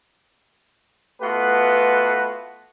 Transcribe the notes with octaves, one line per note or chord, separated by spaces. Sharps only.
A3 B3 F4 F#4 B4